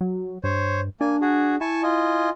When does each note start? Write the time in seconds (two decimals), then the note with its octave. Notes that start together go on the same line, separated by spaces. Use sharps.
0.01 F#3
0.44 G2 C5 C#5
1.01 A#3 D4 G#5
1.21 F#4 G#4
1.61 E4 G#5 A5 C#6
1.83 F4 D#5 G#5